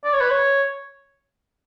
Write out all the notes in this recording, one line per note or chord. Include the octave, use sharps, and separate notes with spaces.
D5
C#5
B4
C#5